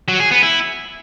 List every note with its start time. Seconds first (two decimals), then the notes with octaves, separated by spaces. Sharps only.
0.08 F#3
0.20 G#4
0.31 B3
0.43 E4